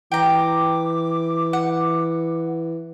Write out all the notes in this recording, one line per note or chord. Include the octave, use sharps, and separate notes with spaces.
E3 G5 A#5 D6
F#5